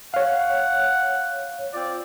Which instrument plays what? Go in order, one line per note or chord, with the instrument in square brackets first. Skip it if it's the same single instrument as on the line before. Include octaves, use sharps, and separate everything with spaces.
[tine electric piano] C#5 F5 [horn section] F#5
[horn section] C4 F4 D5